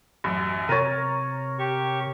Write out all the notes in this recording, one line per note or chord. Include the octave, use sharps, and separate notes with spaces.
A1 F#2
C3 A#4 C#5 A6 D#7
G4 C#6